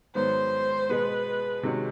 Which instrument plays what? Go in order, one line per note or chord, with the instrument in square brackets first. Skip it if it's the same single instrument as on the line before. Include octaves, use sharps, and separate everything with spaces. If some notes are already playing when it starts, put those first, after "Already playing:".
[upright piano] G#2 D#3 F#3 B3 [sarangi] C5
[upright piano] B2 G#3 B3 [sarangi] B4
[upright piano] C3 D#3 G#3 C#4 F#4